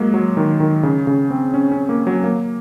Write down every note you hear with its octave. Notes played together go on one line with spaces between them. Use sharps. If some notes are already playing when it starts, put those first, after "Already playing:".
Already playing: F#3 G#3 A#3
F#3
D#3
D#3
C#3
C#3
C4
C#4
C#4
A#3
F#3
A#3